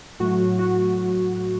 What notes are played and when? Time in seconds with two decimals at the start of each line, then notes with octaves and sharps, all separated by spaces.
0.20 A2 F#3 A3 F#4
0.59 F#4